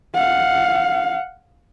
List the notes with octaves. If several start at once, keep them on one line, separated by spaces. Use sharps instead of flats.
F5 F#5